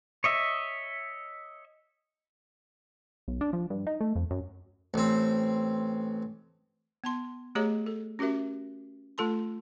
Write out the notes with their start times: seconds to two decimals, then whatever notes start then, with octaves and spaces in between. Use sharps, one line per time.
0.24 C#5 D#5 E5
3.28 B1
3.41 D4
3.53 F3
3.70 G2
3.87 D#4
4.01 A3
4.16 F2
4.31 F#2
4.94 A1 C4
7.04 B3 A5 C6
7.55 A3 G4 G#4 C#5 D#5 A#5
7.86 A4
8.19 C#4 F#4 G4 A#4 E5
9.18 A3 F4 A4 A5 C6